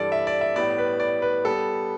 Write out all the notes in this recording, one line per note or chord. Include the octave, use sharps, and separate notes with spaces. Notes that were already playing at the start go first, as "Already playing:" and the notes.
Already playing: G2 E3 G3 A4 D5
E5
D5
E5
A2 G3 B3 D5
B4
D5
B4
G3 B3 A4